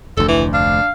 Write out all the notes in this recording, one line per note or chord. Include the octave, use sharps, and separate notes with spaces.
F1 D2 A4
E3
D4 F5